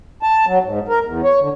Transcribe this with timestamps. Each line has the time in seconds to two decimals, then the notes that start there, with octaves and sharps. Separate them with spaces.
0.23 A5
0.46 F#3
0.64 G#2
0.88 A#4
1.05 E2
1.24 C#5
1.40 D3